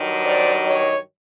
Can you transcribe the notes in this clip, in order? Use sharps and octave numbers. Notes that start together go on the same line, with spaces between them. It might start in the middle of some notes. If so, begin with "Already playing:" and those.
Already playing: G2 D#3 F#3
C5 D5
C#5 D#5